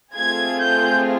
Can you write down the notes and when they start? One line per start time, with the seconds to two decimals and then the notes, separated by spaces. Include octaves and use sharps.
0.16 A3 C4 F4 G#4 G#6
0.62 G6